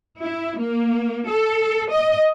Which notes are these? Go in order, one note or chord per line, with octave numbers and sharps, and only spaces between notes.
E4
A#3
A4
D#5